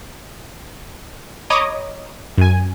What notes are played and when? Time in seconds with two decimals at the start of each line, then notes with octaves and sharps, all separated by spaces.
1.50 C#5 D#5 A#5 B5 D6 D#6
2.38 F#2 G#5